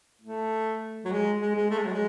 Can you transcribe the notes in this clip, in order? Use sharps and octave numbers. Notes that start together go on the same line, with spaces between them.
A3
F#3
G#3
G#3
G#3
A3
G#3
F#3
G#3